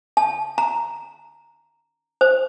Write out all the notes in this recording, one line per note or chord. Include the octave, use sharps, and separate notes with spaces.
A5
A#5
C5